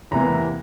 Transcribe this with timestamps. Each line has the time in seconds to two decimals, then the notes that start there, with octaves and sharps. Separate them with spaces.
0.11 E2 C3 E3 A#3 A#5